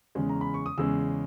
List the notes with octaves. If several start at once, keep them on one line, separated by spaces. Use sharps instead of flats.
E2 C#3 G#3 C#4
A#5
B5
C#6
D#6
E2 C#3 G#3 C#4 E6